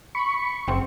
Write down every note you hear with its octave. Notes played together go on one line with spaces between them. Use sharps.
B5 C#6
F#1 C4